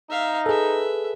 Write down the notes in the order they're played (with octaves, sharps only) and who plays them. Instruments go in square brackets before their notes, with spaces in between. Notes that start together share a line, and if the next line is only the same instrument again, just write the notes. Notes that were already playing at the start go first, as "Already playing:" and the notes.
[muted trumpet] D#4 [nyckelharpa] E5 F5
[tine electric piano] G#4 A4 [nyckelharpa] B4 E5